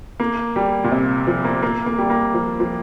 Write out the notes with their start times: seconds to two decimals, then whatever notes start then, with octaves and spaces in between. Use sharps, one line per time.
0.20 A#3
0.56 G3
0.84 A#2
0.91 C3
1.27 F3
1.44 A#3
1.62 A#3
1.86 A#3
1.98 G3
2.10 A#3
2.34 F3
2.60 F3